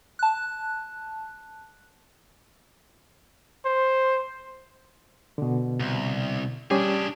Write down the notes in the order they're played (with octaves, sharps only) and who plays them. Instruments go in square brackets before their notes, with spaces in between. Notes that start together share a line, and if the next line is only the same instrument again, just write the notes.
[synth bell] A5 F#6
[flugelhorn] C5
[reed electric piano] B2 D3
[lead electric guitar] C2
[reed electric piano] G3 C#4 G4 [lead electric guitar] D4 G#4